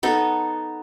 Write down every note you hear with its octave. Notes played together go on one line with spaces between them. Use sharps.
B3 D#4 A4